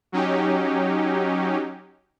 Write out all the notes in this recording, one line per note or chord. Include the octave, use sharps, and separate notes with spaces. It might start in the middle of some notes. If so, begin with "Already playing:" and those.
F#3 C#4 D#4 G4